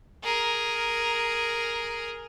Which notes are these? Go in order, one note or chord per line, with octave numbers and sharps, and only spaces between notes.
G#4 A#4